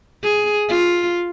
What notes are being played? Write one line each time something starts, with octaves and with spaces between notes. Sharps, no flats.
G#4
F4